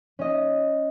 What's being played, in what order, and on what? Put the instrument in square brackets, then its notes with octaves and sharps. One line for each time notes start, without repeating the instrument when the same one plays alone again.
[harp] C#4 D#5